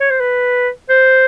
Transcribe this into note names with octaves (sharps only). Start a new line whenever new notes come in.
C#5
C5
B4
C5